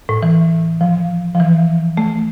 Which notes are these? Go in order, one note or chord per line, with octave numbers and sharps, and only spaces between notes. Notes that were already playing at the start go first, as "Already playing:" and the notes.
A2
E3
F3
F3
E3
A3